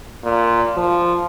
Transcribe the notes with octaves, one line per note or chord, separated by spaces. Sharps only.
A#2
F3